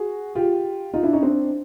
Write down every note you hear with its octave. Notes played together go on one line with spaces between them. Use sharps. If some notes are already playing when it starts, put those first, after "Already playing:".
Already playing: F#4 G#4
F4 G4
D#4 F4
D4 E4
C#4 D#4
C4 D4